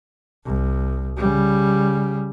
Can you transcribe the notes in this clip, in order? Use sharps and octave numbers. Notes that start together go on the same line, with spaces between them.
C2
C#3 G3